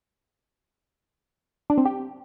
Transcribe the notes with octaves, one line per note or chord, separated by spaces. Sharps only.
D4
C4
G4